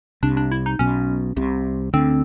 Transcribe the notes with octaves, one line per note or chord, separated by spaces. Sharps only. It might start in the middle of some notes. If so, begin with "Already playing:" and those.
C2 C3 D4
D4
E4
D#4
B1 B2 C#4
C2 C3
D2 D3 C4